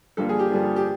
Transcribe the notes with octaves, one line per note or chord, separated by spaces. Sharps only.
G2 D3 F3 A#3 A4
G#4
G4
G2 D3 F3 A#3
G4